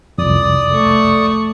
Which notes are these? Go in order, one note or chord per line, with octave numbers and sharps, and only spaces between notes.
C2 F2 D5 D#6
A3 C#6